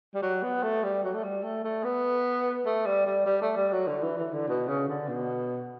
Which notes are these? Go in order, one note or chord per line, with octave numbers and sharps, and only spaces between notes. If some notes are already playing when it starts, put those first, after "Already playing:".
G3
F#3
B3
A3
G3
F#3
A3
G3
A3
A3
B3
A3
G3
G3
G3
A3
G3
F#3
D3
E3
E3
D3
B2
C#3
D3
B2